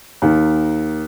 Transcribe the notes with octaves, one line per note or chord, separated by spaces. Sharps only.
D#2 D#3